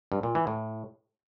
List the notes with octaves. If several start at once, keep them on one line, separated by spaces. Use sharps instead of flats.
G2
A#2
E3
A2